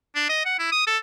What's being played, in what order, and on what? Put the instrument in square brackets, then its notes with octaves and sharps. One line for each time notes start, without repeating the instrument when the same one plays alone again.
[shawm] D4
D#5
F#5
E4
D#6
A4